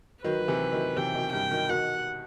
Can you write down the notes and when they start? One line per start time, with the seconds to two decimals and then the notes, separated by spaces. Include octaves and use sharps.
0.24 D#3 F#3 B4
0.40 F#3
0.48 C3 E3
0.72 D#3 F#3
0.96 C3 E3 G5
1.15 B2 D#3
1.33 G2 G5
1.51 B2 D#3
1.69 B2 D#3 F#5